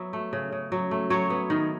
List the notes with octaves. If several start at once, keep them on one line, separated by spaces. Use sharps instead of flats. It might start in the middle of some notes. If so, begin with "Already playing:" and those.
Already playing: F#3 B3 E5
A3
C#3
C#3
F#3
A3
F#3 C#5
B3
D#3